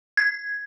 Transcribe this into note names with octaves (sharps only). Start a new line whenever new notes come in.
G#6